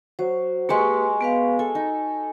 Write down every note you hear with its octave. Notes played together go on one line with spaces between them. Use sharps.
F#3 C5
G#3 A#3 G4 B4 C#6 D6
B3 B4 F5
A4 G#5
D#4